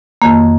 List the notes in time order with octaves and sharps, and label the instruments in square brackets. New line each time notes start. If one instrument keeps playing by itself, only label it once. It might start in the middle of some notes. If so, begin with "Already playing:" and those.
[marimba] F2 D#3 A#3